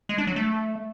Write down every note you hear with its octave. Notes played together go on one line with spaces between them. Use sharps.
G#3
D4
F#3
A3